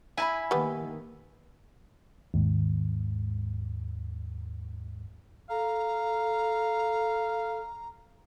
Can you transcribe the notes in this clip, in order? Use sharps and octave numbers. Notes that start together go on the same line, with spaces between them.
E4 G#5 A5 B5
D#3 G3 A#3 B3
D#2 G#2
A4 F5 A#5